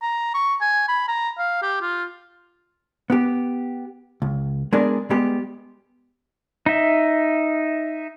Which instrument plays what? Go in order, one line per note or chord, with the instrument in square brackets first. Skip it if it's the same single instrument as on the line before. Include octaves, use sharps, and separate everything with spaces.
[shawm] A#5
C#6
G#5
B5
A#5
F5
G4
F4
[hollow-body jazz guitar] B3 G4
C#2
G#3 B3 D4 G#4 A#4 D5
G3 G#3 B3 G4
[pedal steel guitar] D#4 E5